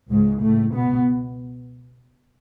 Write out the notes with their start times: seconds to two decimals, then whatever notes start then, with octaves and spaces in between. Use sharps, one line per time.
0.10 C#2 G#2 C#3 G#3
0.42 A2 A3
0.74 B2 B3